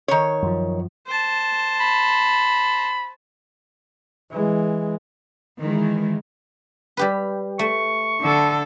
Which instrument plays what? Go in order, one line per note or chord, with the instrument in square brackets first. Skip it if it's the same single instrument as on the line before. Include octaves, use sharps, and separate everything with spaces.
[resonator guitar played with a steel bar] D#3 C#5
[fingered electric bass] F#2 F3
[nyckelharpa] C5 A5
[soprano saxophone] B5
[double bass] E3 G#3
[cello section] D#3 E3 G#3
[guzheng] G3 G4 B4
[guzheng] A3 [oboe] C#6
[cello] D3 A4